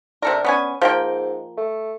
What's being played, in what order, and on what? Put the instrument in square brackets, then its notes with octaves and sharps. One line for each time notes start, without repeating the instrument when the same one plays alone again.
[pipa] C3 A4 A#4 [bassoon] D4
[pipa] B3 C#4 G#5
[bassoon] G#2 [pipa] F3 A#3 G5
[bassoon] A3